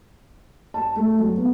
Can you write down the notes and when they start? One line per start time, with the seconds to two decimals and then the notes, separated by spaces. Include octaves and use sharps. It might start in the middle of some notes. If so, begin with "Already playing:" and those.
0.74 A5
0.96 A3
1.19 F#3
1.37 B3